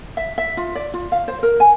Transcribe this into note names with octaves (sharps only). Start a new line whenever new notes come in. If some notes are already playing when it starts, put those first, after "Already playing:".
E5
E5
F4
D5
F4
F5
C5
A#4
G#5